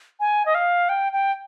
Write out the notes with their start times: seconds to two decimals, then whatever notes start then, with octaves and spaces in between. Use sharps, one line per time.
0.20 G#5
0.46 D#5
0.55 F5
0.89 G5
1.13 G5